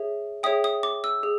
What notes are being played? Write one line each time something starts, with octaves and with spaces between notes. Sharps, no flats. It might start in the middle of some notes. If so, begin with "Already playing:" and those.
Already playing: G#4 C#5 E5
G#4 C#5 E5 G5 D#6
D#6
D6
E6
G#4